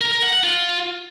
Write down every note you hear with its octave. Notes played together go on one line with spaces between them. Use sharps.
A#4
A#4
F#5
F#5
F4